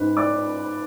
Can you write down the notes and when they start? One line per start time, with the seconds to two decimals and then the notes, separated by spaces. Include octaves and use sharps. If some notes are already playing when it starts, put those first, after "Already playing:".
Already playing: G#2 B4
0.17 D5 D6
0.32 B3